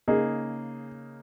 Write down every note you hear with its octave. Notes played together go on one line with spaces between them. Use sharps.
C#3 A#3 D#4 G#4